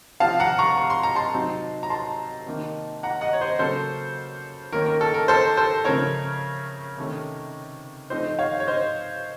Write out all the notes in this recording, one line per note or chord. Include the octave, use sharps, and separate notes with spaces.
C3 F3 C4 F5 A5
F#5 A#5
A#5 C#6
C#6
C6
A#5
A5 C6
C3 F#3 C4 D#4
A#5
A5 C6
C3 D#3 A#3 D#4
F#5 A#5
D#5 F#5
C#5
C5 D#5
C#3 F#3 A#3 C#4 A4 C5
D#3 A#3 C#4 A#4
A#4
A4
A#4
A4 C5
A4 C5
C#3 F3 A3 C4 A#4 C#5
C3 D#3 A3 C#4
F3 A3 C4 D#4 C5 D#5
C#5 F5
C#5
C5 D#5